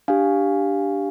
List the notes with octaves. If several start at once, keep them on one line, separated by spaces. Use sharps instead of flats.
D4 G4 F5 G#5